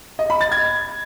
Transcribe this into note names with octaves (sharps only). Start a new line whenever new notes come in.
D#5
B5
A6
G#6